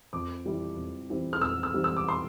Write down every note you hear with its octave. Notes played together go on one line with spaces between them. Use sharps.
F2 D6
E3 G3 C4 E4
F2
E3 G3 C4 E4
F6
F2 E6
E6
E3 G3 C4 E4
E6
D6
C6